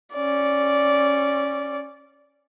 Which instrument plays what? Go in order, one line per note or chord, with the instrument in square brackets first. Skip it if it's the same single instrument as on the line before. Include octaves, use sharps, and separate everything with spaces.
[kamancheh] C#4 D5